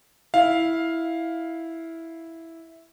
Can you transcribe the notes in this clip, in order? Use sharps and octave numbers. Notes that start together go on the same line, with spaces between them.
E4 F5